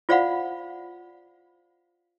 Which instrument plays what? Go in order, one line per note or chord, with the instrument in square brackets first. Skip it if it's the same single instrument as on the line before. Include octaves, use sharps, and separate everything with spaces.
[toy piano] F4 C5 D5 F5 F#5 B5